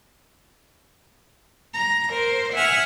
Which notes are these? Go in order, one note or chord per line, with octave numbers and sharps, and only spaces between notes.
A#5
A#4 C5
E5 F#5 G#5 E6 F6